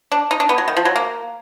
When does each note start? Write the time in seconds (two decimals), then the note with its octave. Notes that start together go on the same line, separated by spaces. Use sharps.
0.12 D4
0.31 D#4
0.40 D4
0.49 B3
0.58 F#3
0.68 D#3
0.77 F3
0.85 F#3
0.96 A#3